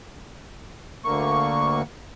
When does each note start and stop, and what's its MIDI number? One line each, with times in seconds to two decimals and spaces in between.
1.05 1.82 38
1.05 1.82 50
1.05 1.82 58
1.05 1.82 85